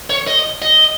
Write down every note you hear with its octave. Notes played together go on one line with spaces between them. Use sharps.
C#5
D#5
D#5